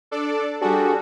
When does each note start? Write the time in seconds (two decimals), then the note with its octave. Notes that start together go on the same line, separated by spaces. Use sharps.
0.11 D4 A4 D5
0.62 G3 D4 F#4 G#4 A4